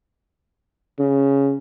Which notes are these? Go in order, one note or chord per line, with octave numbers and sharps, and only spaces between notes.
C#3